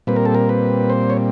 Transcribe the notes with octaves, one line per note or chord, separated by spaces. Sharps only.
A#2 G3 C4 B4
A#4
A4
A#4
B4
C5
C#5